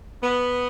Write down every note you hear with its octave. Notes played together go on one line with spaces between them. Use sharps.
B3